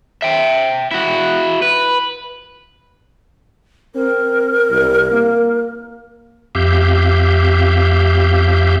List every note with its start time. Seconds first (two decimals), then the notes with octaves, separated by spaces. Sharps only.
0.22 E5 G5
0.91 E4 F#4
1.62 B4
3.95 C4 A#4
4.71 C2
5.12 A#3
6.55 F2 G4 E5 F5 G6